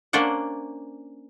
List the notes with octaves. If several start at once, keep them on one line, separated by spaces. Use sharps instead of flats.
A#3 C#4 D4 C5 D5 F#5